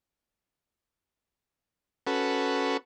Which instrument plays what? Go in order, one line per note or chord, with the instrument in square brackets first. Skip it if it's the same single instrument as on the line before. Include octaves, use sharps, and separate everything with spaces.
[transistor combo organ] C#4 F#4 A4 B4